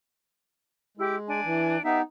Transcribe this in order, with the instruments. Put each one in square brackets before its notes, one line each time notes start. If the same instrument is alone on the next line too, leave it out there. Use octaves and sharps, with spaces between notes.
[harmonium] G#3 [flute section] E4 G4
[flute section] D4 G#5
[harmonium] E3
[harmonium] B3 D#4 [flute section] G4 D#5 E5